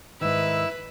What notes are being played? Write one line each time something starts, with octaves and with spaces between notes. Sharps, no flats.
G#2 D#3 E4 B4 E6